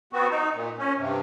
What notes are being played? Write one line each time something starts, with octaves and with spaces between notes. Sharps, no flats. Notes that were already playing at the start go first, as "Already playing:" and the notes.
B3 C4 F#4
D#4
A#2
C#4
G2 C3